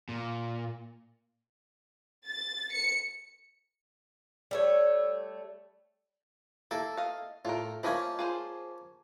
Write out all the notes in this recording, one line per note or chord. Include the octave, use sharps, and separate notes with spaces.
A#2
A6
C#7
G3 A3 C#5
A#3 E4 A4
D#5 F5
A2 F4 A#4
F3 A#3 C#4 E4 D#5 F5
F4 G#4 C5